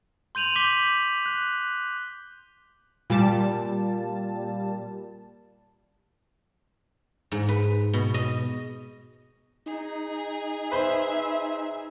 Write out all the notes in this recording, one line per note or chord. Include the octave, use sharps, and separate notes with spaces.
C6 G6 D#7 F7 F#7
D6 G6 B6 G7
F#6
A#2 G3 A5
G#2
B4
B2
D#5
D#4 G#4
B4 C5 E5 C6